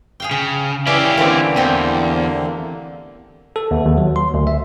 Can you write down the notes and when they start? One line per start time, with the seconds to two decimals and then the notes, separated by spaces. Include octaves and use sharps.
0.20 G#4 F5 G5
0.31 C#3 G5
0.87 E3 C#4 E4 G4 D5 E5 F5
1.17 D3 E3 A3 A#3 C4
1.56 E2 C4 G4
3.56 A4
3.71 D#2
3.85 D#2
3.98 F#3
4.16 C6
4.34 D2
4.47 E5